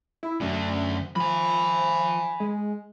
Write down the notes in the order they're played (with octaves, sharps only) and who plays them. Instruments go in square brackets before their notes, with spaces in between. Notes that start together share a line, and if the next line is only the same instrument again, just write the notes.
[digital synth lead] E4
[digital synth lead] F#2 [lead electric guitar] D3 A3
[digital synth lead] F3 [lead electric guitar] G#5 B5
[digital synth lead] G#3